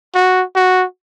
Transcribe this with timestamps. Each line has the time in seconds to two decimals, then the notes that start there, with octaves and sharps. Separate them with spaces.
0.15 F#4
0.56 F#4